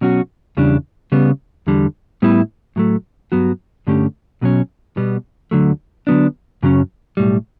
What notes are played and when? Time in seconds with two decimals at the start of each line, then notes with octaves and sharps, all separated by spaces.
0.01 B1 B2 F#3 C#4 F#4
0.57 E2 C#3 G3 D4
1.12 C#3 G3 B3
1.67 E2 D3 G3
2.22 A2 G3 B3 E4 B4
2.76 A2 F#3 A3
3.32 G2 F#3 B3 F#4
3.87 G2 D3 A3 C#4 G4
4.41 B1 B2 F#3 C#4
4.97 B2 G3 B3
5.51 D2 D3 F#3 A3
6.07 D3 F#3 B3 D4
6.63 F#2 C#3 F#3 C#4
7.17 B1 A2 G3